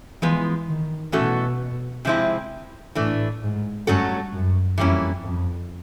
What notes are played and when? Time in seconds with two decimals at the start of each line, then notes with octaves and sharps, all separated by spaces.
0.21 E3 F3 G#3 B3
0.68 D#3
1.12 B2 E3 A3 C#4 F#4 A4
2.05 C3 F3 G#3 C4 E4
2.95 A2 E3 A3 D4
3.42 G#2
3.87 G2 F#3 A3 C#4 F#4 A4
4.33 F#2
4.78 F2 E3 G3 A#3 C#4 E4
5.24 F2